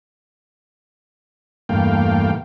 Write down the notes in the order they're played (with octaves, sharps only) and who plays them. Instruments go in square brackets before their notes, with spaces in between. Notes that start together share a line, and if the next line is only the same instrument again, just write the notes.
[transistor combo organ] E2 G2 A3 A#3 F5 G5